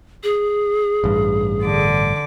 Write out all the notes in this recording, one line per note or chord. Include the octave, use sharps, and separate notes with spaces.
G#4
A1 G2
D3 D6